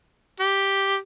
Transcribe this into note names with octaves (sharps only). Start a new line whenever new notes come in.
G4